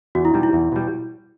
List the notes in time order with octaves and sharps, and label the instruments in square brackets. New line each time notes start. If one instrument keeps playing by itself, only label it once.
[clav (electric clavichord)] E2 [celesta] F#4
[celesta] E4
[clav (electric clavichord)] B2 G3 [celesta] D#4
[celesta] E4
[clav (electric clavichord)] E2
B2 G3